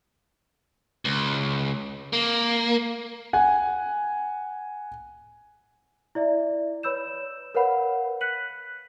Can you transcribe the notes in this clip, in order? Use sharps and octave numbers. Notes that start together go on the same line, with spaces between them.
C#2
A#3
F#5 G#5
E4 D5 E5
B4 C#5 B5 E6 G6 E7
A#4 B4 C#5 F5 F#5 B5
F#6 B6 C#7 D#7 F#7